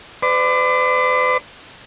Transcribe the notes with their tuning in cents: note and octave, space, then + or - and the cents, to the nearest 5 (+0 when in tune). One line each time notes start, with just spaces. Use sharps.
B4 +45 D5 +15